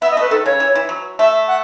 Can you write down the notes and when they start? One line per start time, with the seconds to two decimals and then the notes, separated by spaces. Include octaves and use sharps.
0.02 B3 E5
0.11 D#5
0.17 A3 B4
0.31 D#3 A4
0.45 C#3 C#5
0.60 E3
0.75 E3
0.89 F#3
1.19 A3 E5
1.48 F#5